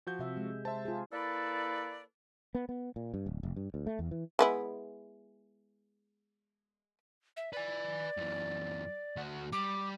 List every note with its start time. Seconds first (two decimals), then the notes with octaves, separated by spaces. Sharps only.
0.07 F3 F#4 G6
0.19 C3 E5
0.37 G#3
0.65 C5 E5 A5
0.85 F4 G#4
1.11 A#3 E4 A4 B4 D5
2.55 B3
2.69 B3
2.96 A#2
3.14 G2
3.26 D1
3.43 F1
3.56 G2
3.74 D2
3.87 A3
3.99 E2
4.11 E3
4.39 G#3 B3 E4
7.37 E5
7.53 B4 D5 G#5
8.17 F#2 E3
9.17 D2 F#4
9.53 G3 D6